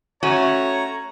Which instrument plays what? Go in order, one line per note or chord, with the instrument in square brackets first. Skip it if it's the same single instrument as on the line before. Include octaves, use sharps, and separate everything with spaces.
[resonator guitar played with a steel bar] A3 C#4 F#4 [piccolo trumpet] C#5 [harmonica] A#5